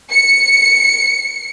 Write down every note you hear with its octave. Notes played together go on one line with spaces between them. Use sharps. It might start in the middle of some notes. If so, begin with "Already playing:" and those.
C#7